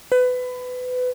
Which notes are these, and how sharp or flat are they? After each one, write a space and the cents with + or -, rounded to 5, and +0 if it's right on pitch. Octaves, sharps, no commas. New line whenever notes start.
B4 +25